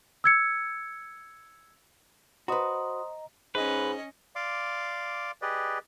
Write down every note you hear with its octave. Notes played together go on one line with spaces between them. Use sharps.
E6 G#6 C#7
F#4 B4 C5 D#5 A#5 C6 D#6
G#2 C#4 B4 D#5
D5 F5 C6 D6
G4 G#4 B4 D5 D#5